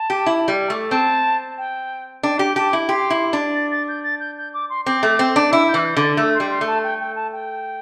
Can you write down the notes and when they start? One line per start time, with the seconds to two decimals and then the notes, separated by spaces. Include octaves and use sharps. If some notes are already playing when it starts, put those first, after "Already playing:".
Already playing: A5
0.10 G4
0.26 E4
0.48 G3
0.70 A3
0.91 C4 A5
1.58 G5
2.23 D4 G5
2.39 G4 G5
2.56 G4 A5
2.73 E4
2.89 G4 C6
3.10 E4
3.33 D4
3.55 A6
3.71 A6
3.88 G6
4.04 A6
4.20 G6
4.38 G6
4.54 D6
4.70 C6
4.86 C4 D6
5.03 A3
5.19 C4
5.36 D4
5.52 E4 E6
5.68 G6
5.74 E3 E6
5.85 G6
5.97 D3
6.02 A6
6.17 A3 E6
6.35 C6
6.40 G3
6.50 C6
6.61 A3
6.67 A5
6.83 G5
7.00 G5
7.16 A5
7.32 G5